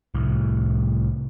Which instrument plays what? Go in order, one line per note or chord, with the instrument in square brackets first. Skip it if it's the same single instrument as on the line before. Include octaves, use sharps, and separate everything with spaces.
[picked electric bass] C2 A2